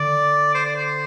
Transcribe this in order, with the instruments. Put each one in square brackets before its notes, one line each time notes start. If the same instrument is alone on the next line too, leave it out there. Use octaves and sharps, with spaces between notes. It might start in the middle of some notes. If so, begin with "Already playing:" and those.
Already playing: [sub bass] D3 [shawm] D5
[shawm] C5
D5
C5